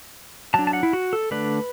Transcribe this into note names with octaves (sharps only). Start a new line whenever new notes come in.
F#3 D4 A5
A5
F#5
E4
F#4
A4
D3 A3 D4 B4